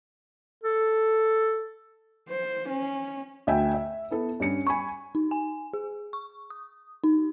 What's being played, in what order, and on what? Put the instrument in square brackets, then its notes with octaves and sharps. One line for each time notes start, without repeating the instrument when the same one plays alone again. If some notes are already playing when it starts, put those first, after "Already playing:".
[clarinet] A4
[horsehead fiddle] C5
C#4
[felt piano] D2 E5 G5 G#5
E5
B3 E4 A4
G2 C#4 C#7
G#5 B5 C#6
[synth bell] D#4
G#5
G#4
C#6
D#6
D#4